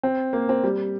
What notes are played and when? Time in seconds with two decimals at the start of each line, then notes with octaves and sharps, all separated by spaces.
0.03 C4
0.33 A#3
0.49 C4
0.64 G3